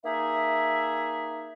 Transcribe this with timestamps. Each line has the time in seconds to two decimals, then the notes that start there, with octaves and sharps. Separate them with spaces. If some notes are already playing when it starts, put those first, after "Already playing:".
0.04 A#3 D#4 G#4 E5